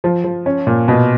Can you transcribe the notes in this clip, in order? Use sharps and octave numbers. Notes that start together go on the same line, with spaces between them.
F3
F3
C#4
A#2
B2